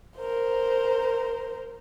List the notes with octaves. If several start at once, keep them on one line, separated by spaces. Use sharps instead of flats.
A#4 C5